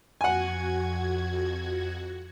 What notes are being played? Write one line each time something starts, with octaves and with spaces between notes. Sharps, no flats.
F2 F#4 F#5 G#5 G#6